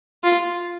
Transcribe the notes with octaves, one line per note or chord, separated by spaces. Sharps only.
F4